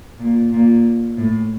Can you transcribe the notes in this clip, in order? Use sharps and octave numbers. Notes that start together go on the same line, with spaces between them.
A#2
A#2
A2